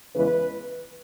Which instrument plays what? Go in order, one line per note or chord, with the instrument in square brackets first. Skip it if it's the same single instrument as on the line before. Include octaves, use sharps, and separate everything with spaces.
[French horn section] E2 C#3 E3 G#3 B4